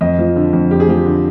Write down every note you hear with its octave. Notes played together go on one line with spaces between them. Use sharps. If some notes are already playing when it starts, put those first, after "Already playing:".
F2 D#5
F3
D3
F2
F2 G4
G#4
F3 G4
D3